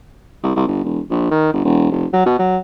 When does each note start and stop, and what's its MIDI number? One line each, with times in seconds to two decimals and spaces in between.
0.43 0.54 36
0.56 0.64 36
0.67 0.83 31
0.84 1.00 28
1.10 1.30 34
1.31 1.50 51
1.53 1.64 31
1.64 1.90 28
1.91 2.06 29
2.13 2.21 54
2.26 2.35 47
2.39 2.57 54